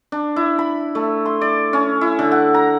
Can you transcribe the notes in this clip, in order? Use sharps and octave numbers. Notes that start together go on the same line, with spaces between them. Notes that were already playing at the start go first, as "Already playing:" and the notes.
D4
E4
B5
A3
C6
D5
C#4
E4
D3
F#5
A#5